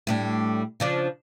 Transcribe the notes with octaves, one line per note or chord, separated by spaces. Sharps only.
A2 G3 D4
C#3 F3 D4